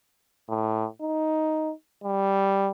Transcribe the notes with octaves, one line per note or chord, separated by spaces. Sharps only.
A2
D#4
G3